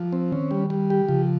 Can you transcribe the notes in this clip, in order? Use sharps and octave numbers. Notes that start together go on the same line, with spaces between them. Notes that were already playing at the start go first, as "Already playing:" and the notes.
Already playing: F3
C4
D#3 C#4
G3
G3
G4
C#3 F3